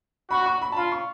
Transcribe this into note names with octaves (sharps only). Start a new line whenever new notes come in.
F#4 B5
C#6
B5
A5
F4 B5
C#6